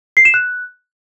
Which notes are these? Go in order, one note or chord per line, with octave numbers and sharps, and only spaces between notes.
C7
E7
F#6